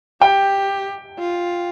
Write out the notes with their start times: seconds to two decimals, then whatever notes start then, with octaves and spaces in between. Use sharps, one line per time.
0.21 G4 G5
1.19 F4